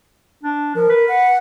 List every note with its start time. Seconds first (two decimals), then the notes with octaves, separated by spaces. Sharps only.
0.43 D4
0.75 F3 A#4
0.89 B4
1.08 F#5